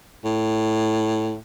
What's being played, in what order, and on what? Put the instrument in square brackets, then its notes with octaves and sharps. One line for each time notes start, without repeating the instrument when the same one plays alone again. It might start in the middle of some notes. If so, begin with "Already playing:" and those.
[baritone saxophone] A2